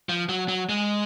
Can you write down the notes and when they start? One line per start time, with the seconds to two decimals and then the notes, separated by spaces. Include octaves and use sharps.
0.09 F3
0.29 F#3
0.48 F#3
0.69 G#3